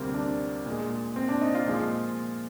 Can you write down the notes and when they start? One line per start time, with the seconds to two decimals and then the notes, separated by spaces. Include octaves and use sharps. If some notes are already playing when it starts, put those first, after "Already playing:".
Already playing: D2 C3 G3 A#3 C4
0.14 D4
0.66 A#2 G#3
1.16 C4
1.29 D4
1.41 D#4
1.55 F4
1.67 A#2 F3 G#3